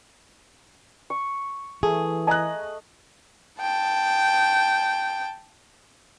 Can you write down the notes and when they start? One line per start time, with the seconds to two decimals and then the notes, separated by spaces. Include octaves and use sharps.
1.10 C#6
1.83 E3 A3 G#4
2.27 D#5 G#5 A#5 F#6
3.61 G5 A5